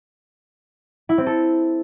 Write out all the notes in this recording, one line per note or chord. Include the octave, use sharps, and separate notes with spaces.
E4
C4
A4